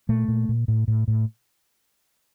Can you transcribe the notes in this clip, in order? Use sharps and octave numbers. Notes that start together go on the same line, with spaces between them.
A#2 A3
A#2
A#2
A2
A2
A2